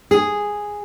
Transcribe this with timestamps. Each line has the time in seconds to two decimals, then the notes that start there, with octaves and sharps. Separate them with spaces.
0.11 G#4